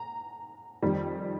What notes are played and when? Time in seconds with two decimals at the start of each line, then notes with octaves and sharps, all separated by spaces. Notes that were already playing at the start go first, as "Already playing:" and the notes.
Already playing: A#5
0.83 F2 D#3 G3